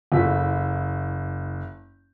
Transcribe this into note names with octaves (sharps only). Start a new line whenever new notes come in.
F#1 E4 F#4 A4 B6